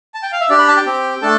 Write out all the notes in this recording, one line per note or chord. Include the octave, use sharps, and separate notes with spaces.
A5
G5
F5
E5
D4 G4 D5
B5
A5
G5
C4 G4
A3 D4 A4 A5